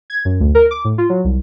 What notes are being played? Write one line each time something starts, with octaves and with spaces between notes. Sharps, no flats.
G#6
F#2
D2
A#4
D6
A2
F4
F#3
C2